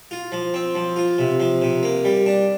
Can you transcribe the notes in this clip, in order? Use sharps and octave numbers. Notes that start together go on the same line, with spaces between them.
F4
F3
C4
F3
F4
C3
F3
C3
A#3
G3
D4